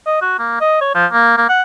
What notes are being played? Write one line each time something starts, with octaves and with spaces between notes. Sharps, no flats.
D#5
F#4
A#3
D#5
C#5
F3
A#3
A#3
F#5